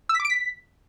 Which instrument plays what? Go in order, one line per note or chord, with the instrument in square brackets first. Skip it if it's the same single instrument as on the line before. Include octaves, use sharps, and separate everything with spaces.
[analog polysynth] E6
B6
D6
D7
B6